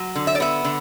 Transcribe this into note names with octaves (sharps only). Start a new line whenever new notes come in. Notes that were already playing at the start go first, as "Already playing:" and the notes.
Already playing: F#3
D3
E5
D5
B3 E5
D3